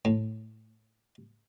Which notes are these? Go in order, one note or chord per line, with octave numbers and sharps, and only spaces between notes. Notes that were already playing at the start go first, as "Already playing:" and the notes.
A2